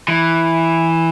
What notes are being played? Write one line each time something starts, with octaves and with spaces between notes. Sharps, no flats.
E3